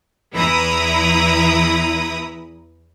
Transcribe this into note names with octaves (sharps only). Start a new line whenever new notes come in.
E2 E3 E4 A#5 B5 D#6